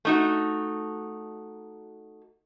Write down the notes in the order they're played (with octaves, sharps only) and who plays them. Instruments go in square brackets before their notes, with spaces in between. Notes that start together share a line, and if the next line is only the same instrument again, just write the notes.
[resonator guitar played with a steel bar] A3 D#4 F#4